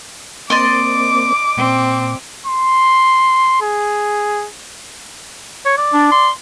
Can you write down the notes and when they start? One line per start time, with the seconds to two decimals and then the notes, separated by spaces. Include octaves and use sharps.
0.50 A#3 C4 D5 D#5 C6 D6
1.57 A#2 C4
2.46 C6
3.62 G#4
5.66 C#5
5.78 D5
5.93 D4
6.12 C6